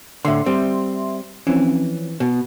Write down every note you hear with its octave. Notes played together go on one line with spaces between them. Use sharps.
A2 D3 E5 C6
G3 C4
E3 F3 C4 C#4
B2